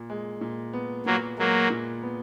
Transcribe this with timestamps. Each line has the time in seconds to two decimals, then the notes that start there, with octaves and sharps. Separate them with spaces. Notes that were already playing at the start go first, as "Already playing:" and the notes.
Already playing: A#2
0.10 G#3
0.41 A#2
0.73 B3
1.06 A#2 F#3 A#3
1.38 F#3 G#3 A#3
1.70 A#2
2.03 B3